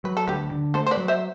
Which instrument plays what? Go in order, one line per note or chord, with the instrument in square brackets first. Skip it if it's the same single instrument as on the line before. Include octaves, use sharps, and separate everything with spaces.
[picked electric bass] F#3 [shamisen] B4
[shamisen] A4
[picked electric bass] D2 [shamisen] G4 B4
[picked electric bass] D3
[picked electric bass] A3 [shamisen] A4 C5
[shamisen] C5
B4 D5
[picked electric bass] F#3
[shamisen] C5 E5